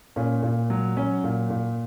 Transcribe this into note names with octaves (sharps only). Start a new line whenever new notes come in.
A#2 C#4
A#2
F#3
F#3 C#4
A#2
A#2